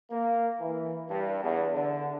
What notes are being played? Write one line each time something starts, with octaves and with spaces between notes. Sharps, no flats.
A#3
E3
G2
E2
D3